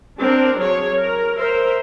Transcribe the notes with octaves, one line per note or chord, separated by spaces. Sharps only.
C4 D4 A#4
F#3 G#4 C#5
A#4
A#4 C5 E5